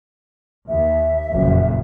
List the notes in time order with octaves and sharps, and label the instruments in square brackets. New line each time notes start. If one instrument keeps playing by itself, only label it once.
[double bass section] D#2 [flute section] E5
[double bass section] F#1 F2 A#2